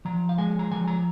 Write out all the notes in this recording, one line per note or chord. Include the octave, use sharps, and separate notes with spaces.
F3 A#5
F5
G#3 G#5
A#5
F3 G#5
A#5